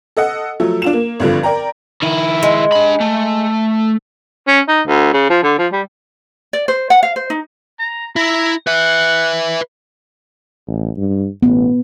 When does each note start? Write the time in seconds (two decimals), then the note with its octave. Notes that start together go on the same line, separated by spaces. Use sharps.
0.17 A4 D#5 F#5
0.60 F3 F#3 A3 A4
0.82 D4 F4 E7
0.93 A#3
1.20 G#1 G2 D3 F3
1.43 A#4 D5 G5 A#5
2.03 D#3 E4
2.43 G#3
2.72 D4 B5
3.00 A3
4.48 C#4
4.68 D#4
4.87 D2
5.13 C#3
5.30 F3
5.43 D3
5.59 F3
5.72 G3
6.53 D5
6.68 C5
6.90 F#5
7.03 F5
7.16 C5
7.30 D#4
7.79 A#5
8.16 E4 A#5
8.67 B4 E5 F#5
10.67 A1
10.97 G2
11.43 A1 B3